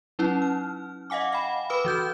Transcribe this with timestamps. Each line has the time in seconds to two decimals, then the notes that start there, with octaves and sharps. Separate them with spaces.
0.19 F#3 C#4 D#4 E4
0.42 F6
1.10 D#5 F5 F#5 G#5 D6
1.32 F5 G5 B5
1.70 B4 B5 D6 D#6 F6
1.85 E3 F#4 G6